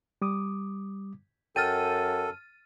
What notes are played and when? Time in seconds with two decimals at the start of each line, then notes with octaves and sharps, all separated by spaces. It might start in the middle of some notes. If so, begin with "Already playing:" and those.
0.22 G3 D6 D#6
1.56 F#2 A4 G5 F6 A6 D#7